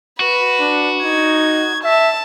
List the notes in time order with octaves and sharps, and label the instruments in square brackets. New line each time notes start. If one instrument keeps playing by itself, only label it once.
[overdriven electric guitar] F#4 [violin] B4
[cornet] D4
[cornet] D#4 [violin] G#6
[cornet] E5 [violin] A5